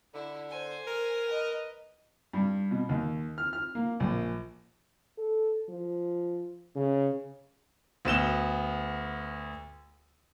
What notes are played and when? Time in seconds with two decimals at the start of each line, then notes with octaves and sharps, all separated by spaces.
0.14 D3 E4
0.49 C5 G#5
0.87 A#4
1.27 B4 D#5
2.33 G2
2.71 B2
2.89 D#2
3.38 F6
3.53 F6
3.75 A#3
4.00 A#1
5.18 A4
5.69 F3
6.75 C#3
8.05 D2 B3 E7 G7